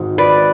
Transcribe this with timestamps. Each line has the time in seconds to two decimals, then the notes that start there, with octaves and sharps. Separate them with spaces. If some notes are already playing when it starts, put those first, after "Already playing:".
Already playing: G#1 G#2 G#3
0.18 B4 D5